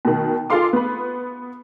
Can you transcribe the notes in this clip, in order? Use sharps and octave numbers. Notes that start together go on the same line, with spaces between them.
B2 D#3
F4 G#4 A4 F5 C6 D6
B3 B4